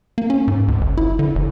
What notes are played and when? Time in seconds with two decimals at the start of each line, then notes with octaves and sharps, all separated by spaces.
0.18 A#3
0.30 C#4
0.48 G#2
0.68 C#2
0.81 G1
0.98 E4
1.19 D3
1.35 F1